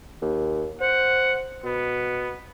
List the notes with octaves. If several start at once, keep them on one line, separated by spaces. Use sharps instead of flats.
D#2
C5 F#5
B2 B3